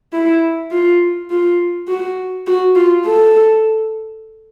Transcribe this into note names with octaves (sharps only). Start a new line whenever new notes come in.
E4
F4
F4
F#4
F#4
F4
A4